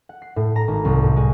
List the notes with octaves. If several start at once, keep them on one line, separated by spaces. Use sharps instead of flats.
F#5
C7
A2
A#5
G#1
C2
A2
G#3